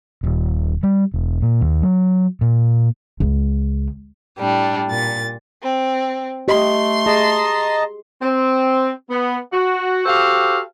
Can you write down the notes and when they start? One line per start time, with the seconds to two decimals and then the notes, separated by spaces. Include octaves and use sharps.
0.23 D#1
0.83 G3
1.14 E1
1.42 A#2
1.61 D#2
1.83 F#3
2.41 A#2
3.20 C#2
4.39 A2 G3 D4
4.89 A#2 A6
5.62 C4
6.48 A3 G4 D#5 C6
7.06 G#4 D#5 A5 A#5
8.22 C4
9.10 B3
9.53 F#4
10.06 F#4 G4 A4 C5 F5